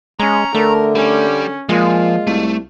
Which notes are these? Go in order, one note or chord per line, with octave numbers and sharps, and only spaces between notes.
G#3 C#4 A#5
D3 A3 A#4
G3 C#4
A#2 F3 G#3 F4
C2 A3